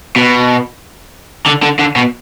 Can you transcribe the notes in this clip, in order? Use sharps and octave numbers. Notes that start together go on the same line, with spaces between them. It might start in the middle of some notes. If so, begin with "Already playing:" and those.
B2
D3
D3
D3
B2